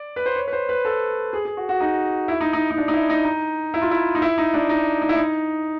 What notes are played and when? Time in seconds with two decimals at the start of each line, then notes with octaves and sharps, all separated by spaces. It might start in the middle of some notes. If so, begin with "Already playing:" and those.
Already playing: D5
0.16 B4
0.26 C5
0.36 C#5
0.48 B4
0.53 C5
0.69 B4
0.85 A4
1.33 G#4
1.45 G#4
1.57 F#4
1.69 F#4
1.80 D#4
2.28 E4
2.41 D#4
2.53 D#4
2.71 D#4
2.78 D4
2.88 D#4
2.93 E4
3.10 D#4
3.24 D#4
3.74 E4
3.82 F4
3.91 E4
4.15 D#4
4.22 E4
4.38 D#4
4.54 D4
4.69 D#4
5.02 D#4
5.09 E4
5.15 D#4